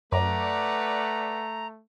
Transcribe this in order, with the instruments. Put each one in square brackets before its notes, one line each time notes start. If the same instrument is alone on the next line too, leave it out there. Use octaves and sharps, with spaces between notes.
[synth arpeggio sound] F#2 [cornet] A3 [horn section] B4 D5 F#5 [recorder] A#5